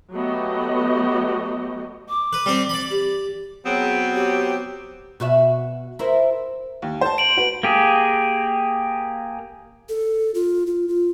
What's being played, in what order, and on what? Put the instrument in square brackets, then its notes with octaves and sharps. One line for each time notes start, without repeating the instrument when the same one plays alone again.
[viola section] F#3 A3 B3 F#4 G4 D#5
[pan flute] D6
[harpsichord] B4
G3 C4 C5
D5 B5
[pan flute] G4
[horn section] F#3 B3 C4 [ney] G#4
[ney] G4
[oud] B2 F#4 E5
E4 A#4 C5
[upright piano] D#2
C5 A5
[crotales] D7 F#7
[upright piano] F#4 B4
[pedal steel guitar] A#3 G4 G#4
[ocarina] A4
F4
F4
F4